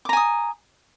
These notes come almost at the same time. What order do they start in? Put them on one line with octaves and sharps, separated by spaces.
D6 A#5 G#5 D#6